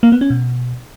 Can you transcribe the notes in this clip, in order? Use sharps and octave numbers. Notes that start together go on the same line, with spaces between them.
A#3
B3
C#4
B2